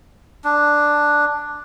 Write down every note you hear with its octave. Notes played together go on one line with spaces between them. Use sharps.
D4